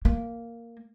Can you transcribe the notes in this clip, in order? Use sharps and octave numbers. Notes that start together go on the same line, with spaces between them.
A#3